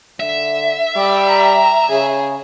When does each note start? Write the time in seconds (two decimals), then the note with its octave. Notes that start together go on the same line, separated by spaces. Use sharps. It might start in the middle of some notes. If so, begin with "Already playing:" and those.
0.20 D3 E5
0.96 G3 D5
1.27 A#5
1.90 C#3 G#4